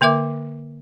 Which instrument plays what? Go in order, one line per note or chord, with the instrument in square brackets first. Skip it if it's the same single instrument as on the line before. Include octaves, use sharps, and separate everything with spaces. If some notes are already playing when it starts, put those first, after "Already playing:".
[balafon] D3 A#3 A#4 E5 D6